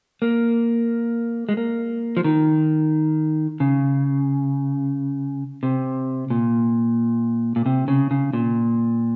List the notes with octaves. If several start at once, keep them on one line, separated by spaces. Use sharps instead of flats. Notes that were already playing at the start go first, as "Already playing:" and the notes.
A#3
G#3
A#3
F3
D#3
C#3
C3
A#2
A#2
C3
C#3
C#3
A#2